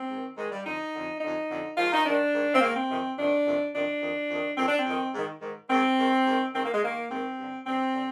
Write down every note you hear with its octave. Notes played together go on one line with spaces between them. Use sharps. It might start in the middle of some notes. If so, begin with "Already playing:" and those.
Already playing: C4
G#2 D#3
G#2 D#3 G#3
G3
F2 D3 D#4
F2 D3
F2 D3 D#4
F2 D3
G#2 D#3 F4
D#4
G#2 D#3 D4
G#2 D#3
C4
G#2 D#3 A#3
C4
F2 C3 D#3
F2 C3 D#3 D4
F2 C3 D#3
F2 C3 D#3 D4
F2 D#3
F2 D#3
F2 D#3 C4
D4
C4
F2 D#3
G#2 D#3
G#2 D#3
G#2 D#3 C4
G#2 D#3
G#2 D#3
G#2 D#3 C4
A#3
G#3
G#2 D#3 A#3
G#2 D#3 C4
G2 D3
G2 D3 C4
D3